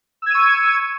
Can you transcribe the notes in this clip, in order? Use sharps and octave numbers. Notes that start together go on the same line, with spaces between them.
C#6 E6 G#6 D#7